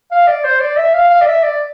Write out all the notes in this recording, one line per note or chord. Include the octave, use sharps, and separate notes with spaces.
F5
D5
C5
D5
E5
F5
F5
D5
E5
D5